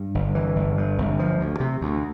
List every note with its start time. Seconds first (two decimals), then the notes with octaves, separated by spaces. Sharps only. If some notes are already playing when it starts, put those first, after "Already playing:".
Already playing: G2
0.15 G1
0.35 E3
0.56 G1
0.77 G2
0.98 G1
1.19 F3
1.40 D2
1.60 C3
1.81 D2